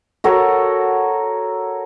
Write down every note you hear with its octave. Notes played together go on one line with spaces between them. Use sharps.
F#4 A4 A#4 C#5